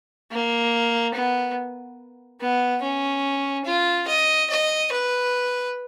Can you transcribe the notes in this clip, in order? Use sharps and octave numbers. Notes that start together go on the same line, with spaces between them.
A#3
B3
B3
C#4
F4
D#5
D#5
B4